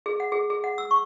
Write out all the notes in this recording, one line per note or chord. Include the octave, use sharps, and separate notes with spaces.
G#4
F#5
G#4
G#4
F#5
E6
C#6